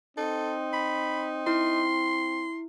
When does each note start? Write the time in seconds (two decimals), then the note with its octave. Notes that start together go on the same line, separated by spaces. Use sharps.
0.17 C4 D#4 A4
0.73 B5
1.47 E4 C6